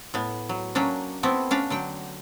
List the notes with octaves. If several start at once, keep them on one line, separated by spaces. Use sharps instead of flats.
A2 B3
F#3
F#3 A#3 C#4 D4
A3 B3 C4 E4
C#4 D4 F5
D3 F#3 G5